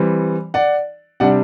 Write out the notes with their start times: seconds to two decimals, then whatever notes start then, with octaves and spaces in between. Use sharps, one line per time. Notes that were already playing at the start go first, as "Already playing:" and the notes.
Already playing: E3 G3 C4
0.54 D5 F#5
1.20 C3 G3 D4 D5 F#5